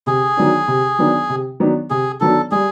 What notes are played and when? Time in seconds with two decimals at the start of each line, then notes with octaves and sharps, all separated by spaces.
0.07 C3 G#4
0.37 D#3 F#3 B3 D4
0.68 C3
0.99 D#3 F#3 B3 D4
1.30 C3
1.60 D#3 F#3 B3 D4
1.90 C3 G#4
2.20 D#3 F#3 B3 D4 A4
2.51 G3 G#4